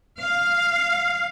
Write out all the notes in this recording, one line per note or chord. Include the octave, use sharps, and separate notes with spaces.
F5